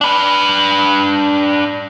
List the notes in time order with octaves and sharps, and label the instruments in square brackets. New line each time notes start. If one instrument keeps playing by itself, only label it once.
[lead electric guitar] D4 B4